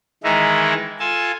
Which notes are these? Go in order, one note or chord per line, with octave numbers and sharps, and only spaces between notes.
D#3 E3 G#3 D#4 E4
F4 A4 G#5 A5